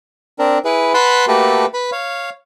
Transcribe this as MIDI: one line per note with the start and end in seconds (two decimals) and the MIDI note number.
0.39 0.58 60
0.39 0.58 62
0.39 0.58 70
0.65 0.93 64
0.65 0.93 68
0.65 0.93 71
0.94 1.25 71
0.94 1.25 78
0.94 1.25 81
0.94 1.25 83
0.94 1.25 84
1.28 1.66 57
1.28 1.66 58
1.28 1.66 66
1.28 1.66 67
1.28 1.66 69
1.28 1.66 71
1.74 1.90 71
1.74 1.90 83
1.92 2.30 73
1.92 2.30 77